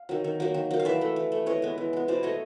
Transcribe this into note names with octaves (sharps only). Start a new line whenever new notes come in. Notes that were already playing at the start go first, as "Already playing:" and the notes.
Already playing: F5
D#3 F#3
D#3
F#3 A#3
D#3
F#3 A#3
F5
E3 D5 E5
A3
E3
A3
E3 C#5 D#5
G#3 B3
E3
G#3 B3
B2 C5 D5
F#3 A3 C#5 D#5